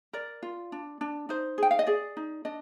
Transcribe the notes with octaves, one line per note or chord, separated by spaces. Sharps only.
A#4 D5
F4
D4
D4
D#4 C5
G#4 G5
F5
D#5
G#4 D5
D#4
D4 D#5